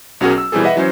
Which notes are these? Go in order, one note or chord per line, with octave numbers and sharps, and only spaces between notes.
B1 F#3 C#4 F#4 G#4 A#4
E6
B2 E3 G3 C4 G#4 A4
B4 D#5 E5 F#5
E3 F#3 C#4 C5